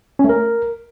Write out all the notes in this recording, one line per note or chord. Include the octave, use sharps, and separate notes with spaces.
C#4
A3
A#4